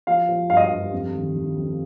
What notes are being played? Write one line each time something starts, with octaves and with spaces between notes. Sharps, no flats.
F3 F5
F3
G2 F5
D#5
F5
G2
F2
D#3
D#3
F2